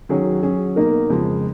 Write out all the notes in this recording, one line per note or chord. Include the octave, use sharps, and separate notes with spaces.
D#3 F#3 C#4 G#4 C#5
F#3 C#4 G#4
B2 A#3 D#4 A#4
F2 C#3 G#3